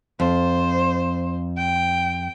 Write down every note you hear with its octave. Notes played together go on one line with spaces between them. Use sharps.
F2 C5
G5